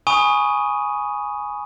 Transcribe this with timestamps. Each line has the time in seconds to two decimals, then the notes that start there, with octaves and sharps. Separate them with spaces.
0.07 G#5 B5 C#6 D#6 D#7